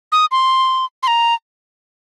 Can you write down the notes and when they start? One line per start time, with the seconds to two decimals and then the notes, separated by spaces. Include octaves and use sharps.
0.12 D#6
0.31 C6
1.03 C6
1.07 A#5